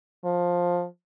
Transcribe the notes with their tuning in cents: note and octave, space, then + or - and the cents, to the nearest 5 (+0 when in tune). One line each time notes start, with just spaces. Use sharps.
F3 +10